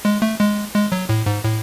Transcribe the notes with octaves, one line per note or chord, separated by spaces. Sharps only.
G#3
A3
G#3
G#3
F#3
A2
G#2
A2